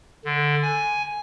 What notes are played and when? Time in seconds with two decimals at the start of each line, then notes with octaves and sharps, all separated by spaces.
0.25 D3
0.62 G#5